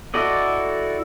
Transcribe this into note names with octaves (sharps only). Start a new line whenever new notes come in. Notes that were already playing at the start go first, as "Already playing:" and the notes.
E4 F#4 A4 D5 D#5